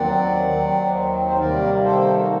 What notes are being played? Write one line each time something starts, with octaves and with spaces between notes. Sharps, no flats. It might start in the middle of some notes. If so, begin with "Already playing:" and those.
Already playing: D#2 D#3 F#3 C4 D5 F#5
D#2 D#3 F#3 C4
C5
C3 D#3 G3 A#3 A#4 D5
A4 C5
D#4
F#4